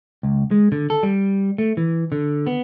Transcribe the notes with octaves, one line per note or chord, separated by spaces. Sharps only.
C#2
G#3
D3
A4
G3
A3
E3
D3
B3